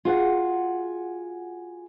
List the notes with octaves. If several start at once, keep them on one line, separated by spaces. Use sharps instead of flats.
F4 F#4 G#4 F#5